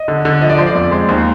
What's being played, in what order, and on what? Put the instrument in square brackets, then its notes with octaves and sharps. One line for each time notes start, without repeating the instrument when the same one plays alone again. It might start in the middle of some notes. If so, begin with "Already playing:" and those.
Already playing: [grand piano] D#5
D3
D3
F3 D#5
D5
F3 C5
D5
F2
G#3 C5
D#2 C5